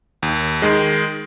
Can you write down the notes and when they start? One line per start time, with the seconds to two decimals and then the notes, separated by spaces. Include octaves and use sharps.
0.23 D#2
0.62 D#3 G#3